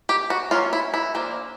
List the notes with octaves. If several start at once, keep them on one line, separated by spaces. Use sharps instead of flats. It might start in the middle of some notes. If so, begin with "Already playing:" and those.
G4
F#4
F#3 A#3 C#4 F4
E4
E4
F3 A#3 D4